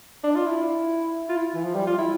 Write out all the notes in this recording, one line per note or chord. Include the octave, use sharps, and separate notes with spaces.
D4
F4
E4
F4
E4
E3
F3
G3
F4
E4